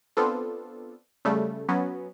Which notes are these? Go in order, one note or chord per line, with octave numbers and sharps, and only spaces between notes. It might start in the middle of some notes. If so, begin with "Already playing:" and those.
B3 C4 D4 F4 A4
C#3 G3 A3
F#3 B3 C#4